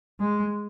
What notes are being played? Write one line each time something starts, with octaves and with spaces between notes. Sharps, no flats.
G#3